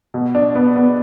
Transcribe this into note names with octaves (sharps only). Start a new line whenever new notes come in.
B2
D4
B3
B3